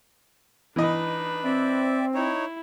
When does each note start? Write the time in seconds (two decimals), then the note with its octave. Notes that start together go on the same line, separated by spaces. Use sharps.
0.76 E3 D4 D#4 B4 D#5
1.44 C4 D5 E5
2.14 D#4 E4 C#5